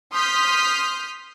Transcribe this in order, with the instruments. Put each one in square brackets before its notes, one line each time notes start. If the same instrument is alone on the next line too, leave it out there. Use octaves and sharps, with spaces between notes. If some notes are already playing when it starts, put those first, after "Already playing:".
[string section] C6 D#6 F6 G6 B6